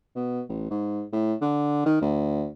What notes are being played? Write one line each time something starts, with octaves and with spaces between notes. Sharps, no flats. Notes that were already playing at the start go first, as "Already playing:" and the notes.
B2
A1
G#2
A2
D3
D#3
D2